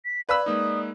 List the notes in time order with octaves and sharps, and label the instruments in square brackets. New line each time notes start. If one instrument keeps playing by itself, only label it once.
[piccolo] B6
[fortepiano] B4 B5 E6 [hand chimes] D5 [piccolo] F5
[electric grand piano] G#3 A#3 D#4 [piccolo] D#6